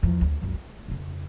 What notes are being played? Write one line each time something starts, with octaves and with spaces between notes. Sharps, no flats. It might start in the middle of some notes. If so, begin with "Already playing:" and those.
E2 F3
D2
C#2 F#2
A3
F2 C#3